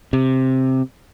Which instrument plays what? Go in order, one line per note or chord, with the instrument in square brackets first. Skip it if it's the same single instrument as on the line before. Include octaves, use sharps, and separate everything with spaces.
[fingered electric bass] C3